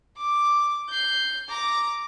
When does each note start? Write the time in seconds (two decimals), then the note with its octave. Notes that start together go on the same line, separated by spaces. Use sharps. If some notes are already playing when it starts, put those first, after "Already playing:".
0.18 D6
0.90 G6 C7
1.49 A#5 D6